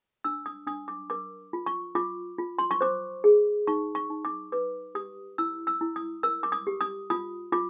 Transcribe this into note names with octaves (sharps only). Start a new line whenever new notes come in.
D4 E6
D#6
D4 D#6
D6
A#4 D6
F4
C#6
F4 D6
F4
C6
C#6
C5 D6
G#4
D#4 C#6
C#6
D#4
D6
B4 D6
G4 D#6
E4 E6
E6
E4
D#6
A#4 E6
D6
D#6
G4
D#6
F4 D#6
F4 D6